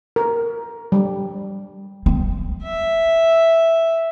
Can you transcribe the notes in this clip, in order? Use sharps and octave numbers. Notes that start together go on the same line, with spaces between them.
A#4
G3
C4
E5